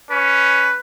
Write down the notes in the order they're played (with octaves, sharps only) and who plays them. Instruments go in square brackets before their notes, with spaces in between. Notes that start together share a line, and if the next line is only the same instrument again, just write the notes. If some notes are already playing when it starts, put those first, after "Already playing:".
[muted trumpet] C#4 [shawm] B4